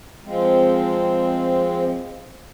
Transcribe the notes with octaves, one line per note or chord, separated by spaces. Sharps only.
F3 G#3 C4